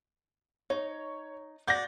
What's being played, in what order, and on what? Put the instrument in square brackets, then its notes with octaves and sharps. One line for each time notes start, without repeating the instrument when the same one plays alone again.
[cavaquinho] D#4 [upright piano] C#5
[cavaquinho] F#4 D5 [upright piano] G6 A#6